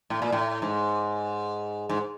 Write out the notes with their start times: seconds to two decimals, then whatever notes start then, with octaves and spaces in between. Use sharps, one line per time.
0.10 A2
0.22 A#2
0.32 A2
0.62 G#2
1.89 G#2